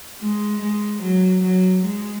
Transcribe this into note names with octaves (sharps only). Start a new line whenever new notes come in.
G#3
G#3
F#3
F#3
G#3